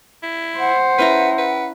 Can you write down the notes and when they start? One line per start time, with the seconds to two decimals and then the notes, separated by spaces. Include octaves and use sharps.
0.23 E4
0.59 C5 F#5
0.99 C#4 E4 B4 A#5
1.38 B4